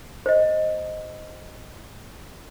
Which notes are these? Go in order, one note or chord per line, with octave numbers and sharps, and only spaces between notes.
C5 D#5